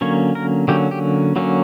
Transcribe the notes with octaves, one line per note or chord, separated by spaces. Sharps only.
D3 F#3 A#3 C#4 C#5
A#4
D3 F#3 A#3 C#4 G4
G4
D3 F#3 A#3 C#4